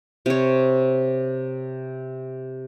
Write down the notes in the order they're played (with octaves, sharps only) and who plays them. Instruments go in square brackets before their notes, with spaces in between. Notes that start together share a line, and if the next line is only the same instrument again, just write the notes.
[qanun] C3 C#5